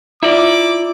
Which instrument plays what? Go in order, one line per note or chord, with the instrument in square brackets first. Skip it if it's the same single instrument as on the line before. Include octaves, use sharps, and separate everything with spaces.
[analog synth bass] E4 [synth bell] F4 [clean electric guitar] D5 E5 [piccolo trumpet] D6